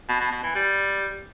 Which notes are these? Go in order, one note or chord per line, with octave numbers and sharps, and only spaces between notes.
B2
B2
B2
E3
G3